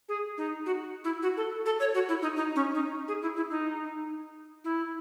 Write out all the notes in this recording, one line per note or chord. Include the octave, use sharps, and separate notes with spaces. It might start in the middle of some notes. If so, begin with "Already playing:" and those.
G#4
D#4
F#4
E4
F#4
A4
A4
C#5
F#4
E4
D#4
D#4
C#4
D#4
G#4
E4
E4
D#4
E4